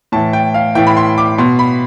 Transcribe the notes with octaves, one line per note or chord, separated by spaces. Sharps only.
A2 E3 A5
G5
F5
A2 E3 G5
B5
C6
D6
B2 C6
B5